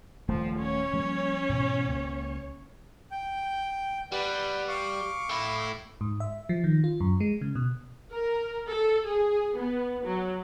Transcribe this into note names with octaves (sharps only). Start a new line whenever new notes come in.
D#1 F3 A3
C#4 C#5
F3 G3 A#3
G#2 B2 E3
C#2 A#3
G5
G3 B4 D5 F#5
F5 C#6 D6
A3 E4
G#2
E5
F3
D#3
F4
F#2
G#3
C#3
B2
A#4
A4
G#4
B3
F#3